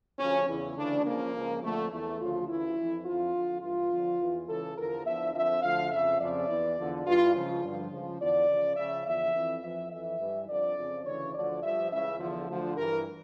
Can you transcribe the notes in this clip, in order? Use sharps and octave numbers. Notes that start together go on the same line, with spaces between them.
D2 C#3 F3 C#4
E2 C#3 E3
D2 C#3 E3 D4
C#2 C#3 F3 A#3
C#2 C#3 F3
F2 D3 F3 A3
E2 E3 A3
D2 C#3 F3 F4
D2 C#3 E3 E4
F2 E3
F2 D3 F3 F4
F2 D3 F3
G2 E3 F4
F2 D3 F3
E2 E3
C#2 C#3 E3 A4
E2 D3 F3 A#4
E2 D3 F3 E5
F2 D3 F3 E5
D2 D3 F3 F5
F2 C#3 F3 E5
F2 C#3 F3 D5
E2 E3
E2 D3 F3
G2 E3 F4
C#2 C#3 F3
G2 D3 F3
C#2 C#3 F3
E2 D3 F3 D5
C#2 C#3 F3
C#2 C#3 F3 E5
E2 D3 F3 E5
F2 E3
F2 E3 E5
F2 E3 E5
G2 E3
F2 D3 F3 D5
F2 C#3 F3
D2 C#3 E3 C#5
D2 D3 F3 D5
G2 F3 E5
C#2 C#3 E3 E5
E2 D3 F3
D2 D3 F3
G2 E3 A#4